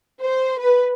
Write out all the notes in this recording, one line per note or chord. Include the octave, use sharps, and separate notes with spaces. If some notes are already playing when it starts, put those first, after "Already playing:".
C5
B4